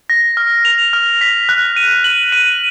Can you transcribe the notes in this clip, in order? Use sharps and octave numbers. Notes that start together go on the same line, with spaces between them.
A#6
F6
F7
F6
B6
F#6
D#7
F#7
D#7